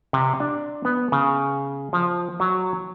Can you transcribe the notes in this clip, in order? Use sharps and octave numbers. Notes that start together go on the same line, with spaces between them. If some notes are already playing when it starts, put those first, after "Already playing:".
C3
D4
B3
C#3
F3
F#3